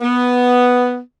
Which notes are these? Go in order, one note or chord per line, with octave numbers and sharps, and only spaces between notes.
B3